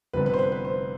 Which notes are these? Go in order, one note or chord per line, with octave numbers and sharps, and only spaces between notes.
F1 F2 D3 G3 B3 B4
B4
C5
B4
B4
C5